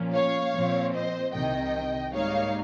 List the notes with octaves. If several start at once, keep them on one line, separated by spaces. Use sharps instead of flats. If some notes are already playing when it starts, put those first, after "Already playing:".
Already playing: A#2 F3 A#3 C#4
C#5 F5
A#2 F3 C4
C5 D#5
C2 C3 D#3 D#5 G5
G#2 G3 A#3 D#4 C#5 F5